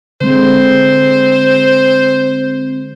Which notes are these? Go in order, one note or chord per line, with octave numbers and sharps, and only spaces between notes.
D3 G#3 C4 C5